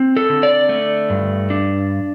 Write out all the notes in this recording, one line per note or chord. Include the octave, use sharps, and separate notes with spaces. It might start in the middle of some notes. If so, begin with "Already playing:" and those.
Already playing: C4
A4
D3
D5
A3
G2
D4